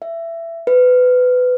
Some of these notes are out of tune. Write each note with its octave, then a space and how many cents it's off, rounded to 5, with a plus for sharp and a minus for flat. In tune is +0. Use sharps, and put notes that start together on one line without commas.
E5 +20
B4 +20